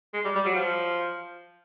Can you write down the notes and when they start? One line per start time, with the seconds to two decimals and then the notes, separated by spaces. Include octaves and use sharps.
0.13 G#3
0.25 G3
0.35 G3
0.45 F#3
0.55 F3